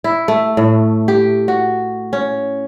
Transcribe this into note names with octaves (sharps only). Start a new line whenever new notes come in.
E4
A3
A2
G4
F#4
C#4